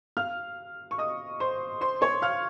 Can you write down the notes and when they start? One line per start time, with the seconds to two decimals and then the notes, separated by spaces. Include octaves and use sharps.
0.17 F5 F6
0.91 C#6
0.98 D#5 D#6
1.40 C5 C6
1.81 C5 C6
2.01 C#5 C#6
2.22 F5 F6